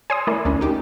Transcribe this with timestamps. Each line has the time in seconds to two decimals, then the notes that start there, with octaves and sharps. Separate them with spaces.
0.10 C#5 D5 G#5 C6 D#6
0.27 A3 E4 A#4 D5
0.45 D2 C#4 D4 D5
0.61 D#4 G4